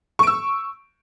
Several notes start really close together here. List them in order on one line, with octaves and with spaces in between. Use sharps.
C#6 D7 E6